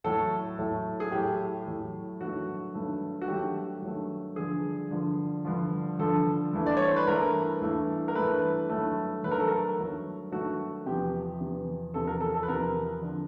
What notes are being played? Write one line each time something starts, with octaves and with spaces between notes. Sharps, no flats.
A2 F#3 A3 A4
A2 F#3 A3
G#4
A2 F#3 A3 G4
A2 F#3 A3
G2 D#3 F#3 A3 F#4
G2 D#3 F#3 A3
F#4
G2 D#3 F#3 A3 G4
G2 D#3 F#3 A3
G2 D3 F3 G#4
G2 D3 F3
G2 D3 F3
G2 D3 F3 A4
G2 E3 A3
D5
C#5
C5
B4
G2 E3 A3 A#4
G2 E3 A3
A#4
G2 E3 A3 B4
G2 D#3 F#3 A3
G2 D#3 F#3 A3 B4
A#4
A4
A#4
G2 D#3 F#3 A3
G2 D#3 F#3 A3 F#4
E2 C3 F3 G4
E2 C3 F3
E2 C3 F3 A4
A#4
A4
A4
B4
E2 C3 F3 A#4
D3 F3